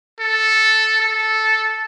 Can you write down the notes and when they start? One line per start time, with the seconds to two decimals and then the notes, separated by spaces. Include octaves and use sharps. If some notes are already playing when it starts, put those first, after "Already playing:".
0.20 A4
1.00 A4